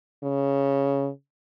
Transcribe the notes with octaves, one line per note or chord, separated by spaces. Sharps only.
C#3